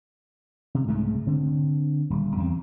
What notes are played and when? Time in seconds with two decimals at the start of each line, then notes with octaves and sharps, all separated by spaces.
0.75 C3
0.87 C2 G#2 C#3 A3
1.27 D3 C4
2.10 D#1 G3
2.37 E2 C4